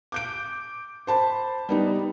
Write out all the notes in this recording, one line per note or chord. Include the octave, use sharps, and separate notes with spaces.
D6 G6 D7
C5 A5 B5
G3 B3 D#4